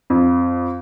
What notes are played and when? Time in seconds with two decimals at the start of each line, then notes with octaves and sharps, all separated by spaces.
0.10 F2